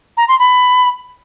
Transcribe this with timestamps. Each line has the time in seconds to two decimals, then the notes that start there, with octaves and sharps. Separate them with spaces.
0.17 A#5
0.28 C6
0.39 B5